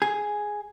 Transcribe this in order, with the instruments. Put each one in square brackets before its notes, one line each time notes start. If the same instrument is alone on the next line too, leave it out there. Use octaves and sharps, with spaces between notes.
[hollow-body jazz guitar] G#4